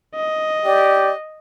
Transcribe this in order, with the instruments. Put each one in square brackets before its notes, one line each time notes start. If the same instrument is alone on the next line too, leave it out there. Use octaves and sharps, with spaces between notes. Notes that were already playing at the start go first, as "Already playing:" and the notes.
[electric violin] D#5
[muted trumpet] G4 [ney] D5